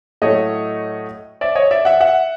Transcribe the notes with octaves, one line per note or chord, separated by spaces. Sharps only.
A2 F#3 A3 C#5 D#5
D5 E5
C#5 D#5
D5 E5
E5 F#5
E5 F#5